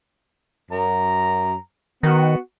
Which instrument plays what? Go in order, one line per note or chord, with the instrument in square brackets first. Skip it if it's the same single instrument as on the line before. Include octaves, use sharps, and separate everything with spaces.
[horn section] F#2 A#5
[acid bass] D#3 [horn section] B3 F#4